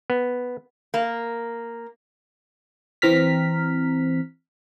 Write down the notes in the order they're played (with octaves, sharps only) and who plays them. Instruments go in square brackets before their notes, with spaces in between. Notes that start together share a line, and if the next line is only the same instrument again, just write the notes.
[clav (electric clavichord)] B3
[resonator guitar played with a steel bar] A#3
[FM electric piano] E3 C4 A#5 F6 B6